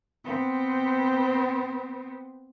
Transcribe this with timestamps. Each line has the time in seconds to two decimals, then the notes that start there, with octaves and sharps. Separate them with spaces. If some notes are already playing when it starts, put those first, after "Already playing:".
0.25 B3 C4